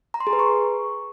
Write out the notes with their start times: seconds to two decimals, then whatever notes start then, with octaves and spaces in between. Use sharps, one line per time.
0.14 A#5
0.20 C6
0.27 G#4
0.33 B4
0.39 C#6